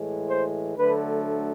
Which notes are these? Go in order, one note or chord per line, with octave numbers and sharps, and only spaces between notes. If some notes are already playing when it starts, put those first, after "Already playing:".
Already playing: A2 E3 G#3
C5
D2 D3 F#3 A3 B4